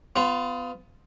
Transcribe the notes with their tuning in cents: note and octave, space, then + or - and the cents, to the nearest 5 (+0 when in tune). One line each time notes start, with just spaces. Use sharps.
B3 +30 F4 +0